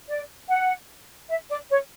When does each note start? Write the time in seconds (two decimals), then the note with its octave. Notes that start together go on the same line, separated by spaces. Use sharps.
0.08 D5
0.48 F#5
1.29 E5
1.49 D5
1.70 C#5